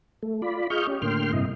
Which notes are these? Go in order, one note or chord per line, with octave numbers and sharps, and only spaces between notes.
A3
F4 D5 B5
F4 G#4 D#5 C#6 F6 G6
C#4 G4
A2 D3 A#3 G5 C6 F6
G2 C3 E4 D#5